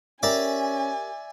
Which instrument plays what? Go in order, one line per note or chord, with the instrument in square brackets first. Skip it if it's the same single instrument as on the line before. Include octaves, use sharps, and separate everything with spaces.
[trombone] C#4 [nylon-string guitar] G4 A#4 [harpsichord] D5 E5 D6 [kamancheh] G#5